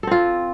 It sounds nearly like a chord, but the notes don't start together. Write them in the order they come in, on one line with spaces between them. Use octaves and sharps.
A4 C4 F4